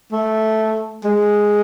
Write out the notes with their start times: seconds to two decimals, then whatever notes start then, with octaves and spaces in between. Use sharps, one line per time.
0.12 A3
1.04 G#3